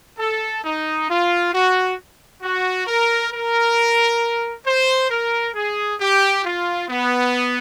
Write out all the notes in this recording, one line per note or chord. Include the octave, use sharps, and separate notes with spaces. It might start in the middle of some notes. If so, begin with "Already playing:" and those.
A4
D#4
F4
F#4
F#4
A#4
A#4
C5
A#4
G#4
G4
F4
B3